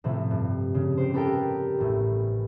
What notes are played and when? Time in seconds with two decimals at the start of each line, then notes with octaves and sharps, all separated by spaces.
0.04 A2 C3 F3
0.31 G2
0.74 C#3
0.97 G4 C5
1.14 B3 G4 A4 A#4 G5
1.79 A1 A2